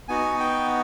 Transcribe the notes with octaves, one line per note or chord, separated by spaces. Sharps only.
B3 D#4 F#4 G#5
G5